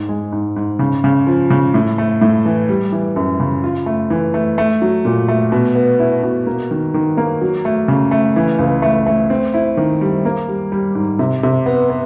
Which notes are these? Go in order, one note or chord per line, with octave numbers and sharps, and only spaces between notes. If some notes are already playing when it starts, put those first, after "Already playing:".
Already playing: G#2
G#3
G#2
G#2
C#3
C#3
F3
C#3
A2
A3
A2
E3
G3
E3
F#2
C#3
F4
A3
E3
A3
A3
F#3
A#2
A3
B2
B3
E4
B2
A#3
D#3
D#3
A#3
F#3
A3
C#3
A3
E3
C#2
A3
A3
C4
E4
D#3
G3
A#3
G3
G3
G#2
C3
C3
B3
B3